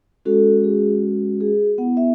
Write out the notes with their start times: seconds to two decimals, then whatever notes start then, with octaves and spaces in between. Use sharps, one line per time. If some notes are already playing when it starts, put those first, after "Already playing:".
0.25 G#3 C#4 F#4 A4
0.64 G#4
1.40 G#4
1.78 B3 E4 F#5
1.97 E5